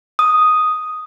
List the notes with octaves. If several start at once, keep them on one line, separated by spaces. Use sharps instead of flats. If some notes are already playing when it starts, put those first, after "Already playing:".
D#6